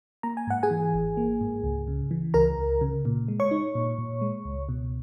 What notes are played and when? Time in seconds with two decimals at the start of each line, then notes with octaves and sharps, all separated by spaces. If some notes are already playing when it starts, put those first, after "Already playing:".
0.23 A#3 A#5
0.37 G#5
0.47 G#2 F#5
0.63 G#4 G#5
0.71 E3
0.94 G#1
1.17 A#3
1.41 G#2
1.64 C#2
1.88 C#3
2.11 E3
2.34 C#2 A#4 A#5
2.58 C#2
2.81 C#3
3.05 A#2
3.28 G#3
3.40 C#5 C#6
3.51 D#4
3.75 A#2
3.98 A#2
4.22 G#3
4.45 C#2
4.69 B2